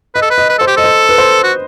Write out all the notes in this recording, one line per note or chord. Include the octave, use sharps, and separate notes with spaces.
B4 D#5
A4
B4
D#5
B4
A4 C5
G4
A4 D#5
C5
B4
C5
F#4